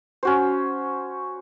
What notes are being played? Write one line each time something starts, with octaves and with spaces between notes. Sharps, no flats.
C#4 F#4 C5